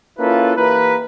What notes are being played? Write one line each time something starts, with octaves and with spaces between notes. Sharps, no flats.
A#3 C#4 E4 F4 A4 B4
E3 A#3 G4 A#4 B4